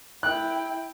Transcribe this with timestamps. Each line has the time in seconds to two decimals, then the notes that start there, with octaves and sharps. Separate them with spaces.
0.23 E4 G5 F#6